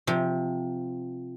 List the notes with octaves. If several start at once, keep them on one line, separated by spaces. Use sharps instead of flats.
C3 F3